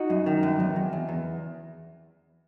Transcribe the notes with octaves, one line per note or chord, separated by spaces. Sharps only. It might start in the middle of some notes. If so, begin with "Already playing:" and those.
Already playing: D#4 F#4
F#2
D#3
F#2
E2
E2
E2
E2